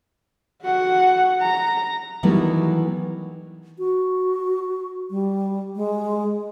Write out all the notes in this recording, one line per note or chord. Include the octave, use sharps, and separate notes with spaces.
F#4 F#5
A#5
D#3 E3 F#3 G3 A3 B3
F#4
G3
G#3